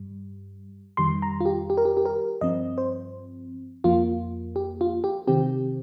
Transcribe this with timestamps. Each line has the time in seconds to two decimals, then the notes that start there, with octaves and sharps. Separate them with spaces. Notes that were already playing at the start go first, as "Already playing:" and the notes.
Already playing: G2 G3
0.97 F2 D#3 G3 C6
1.22 A#5
1.41 F4
1.46 G4
1.70 G4
1.77 A#4
1.85 G4
1.97 G4
2.05 A#4
2.41 G2 F3 C4 D#5
2.78 C5
3.84 F2 F3 A#3 F4
4.56 G4
4.81 F4
5.04 G4
5.27 C3 D#3 C4 G4